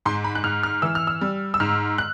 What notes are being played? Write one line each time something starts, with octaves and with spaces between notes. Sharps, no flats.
G#2 C6
B5
F#6
G#2 F6
F6
E3 E6
F6
E6
G3
E6
G#2 F6
F#6